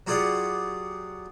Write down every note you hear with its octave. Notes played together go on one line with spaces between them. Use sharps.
F#3 F4 G4 G#4 D5 F#5